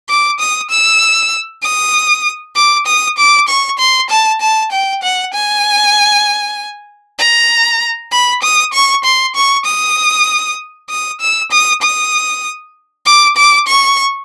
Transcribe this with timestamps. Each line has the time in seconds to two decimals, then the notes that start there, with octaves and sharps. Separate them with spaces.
0.09 D6
0.40 D#6
0.70 E6
1.63 D#6
2.56 D6
2.87 D#6
3.18 D6
3.48 C#6
3.79 C6
4.10 A5
4.41 A5
4.72 G5
5.03 F#5
5.34 G#5
7.19 A#5
8.12 B5
8.43 D#6
8.73 C#6
9.04 C6
9.35 C#6
9.66 D#6
10.90 D#6
11.21 E6
11.51 D#6
11.82 D#6
13.06 D6
13.37 D6
13.68 C#6